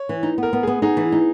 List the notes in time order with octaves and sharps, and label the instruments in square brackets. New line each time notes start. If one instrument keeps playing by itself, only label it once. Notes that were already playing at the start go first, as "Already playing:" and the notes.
Already playing: [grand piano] C#5
[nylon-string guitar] E3
D#4
B3
[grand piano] A#4
[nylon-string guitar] B3
[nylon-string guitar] B3 [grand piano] G#4
[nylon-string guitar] D#4 [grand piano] G#4
[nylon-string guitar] E3
D#4